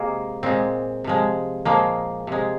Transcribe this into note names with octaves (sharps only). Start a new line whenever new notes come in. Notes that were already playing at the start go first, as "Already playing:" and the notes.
Already playing: C3 G#3 A#3
A#2 G#3 C4
C3 F3 G#3
A#2 F3 G#3 A#3
C3 G#3